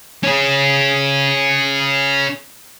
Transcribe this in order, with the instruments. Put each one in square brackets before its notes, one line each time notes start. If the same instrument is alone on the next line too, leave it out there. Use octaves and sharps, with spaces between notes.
[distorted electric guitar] C#4 G#4